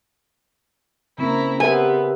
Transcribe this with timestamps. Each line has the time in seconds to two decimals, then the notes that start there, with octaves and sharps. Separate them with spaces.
1.18 C#3 A#3 C4 C#4 E4 A#4 A#5
1.60 B3 C4 G4 A#4 B4 E5 G#5